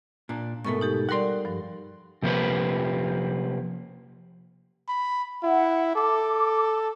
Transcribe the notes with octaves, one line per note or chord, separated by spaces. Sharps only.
A#2 D4
G#2 B2 A3 A4 A#4 C#6
D#4 G4 A4
G3 A#4 D5 F#5 C6
G2 F3
C3 F3 A#3 G4 B4
B5
E4 F#5
A4 D6